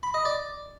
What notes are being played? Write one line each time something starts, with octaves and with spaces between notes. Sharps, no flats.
B5
D#5
D5